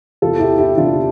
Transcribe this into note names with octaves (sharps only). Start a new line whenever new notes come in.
E2 C3 E3 F4 A4
E4 G4
E4 G4
E2 C3 E3 D4 F4